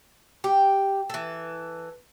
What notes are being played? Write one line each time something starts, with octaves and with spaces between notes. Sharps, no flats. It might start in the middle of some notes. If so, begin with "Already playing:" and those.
G4
E3 A4